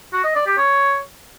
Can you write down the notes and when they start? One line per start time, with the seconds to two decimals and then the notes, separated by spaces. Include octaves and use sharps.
0.13 F#4
0.24 D#5
0.35 D5
0.46 G4
0.58 C#5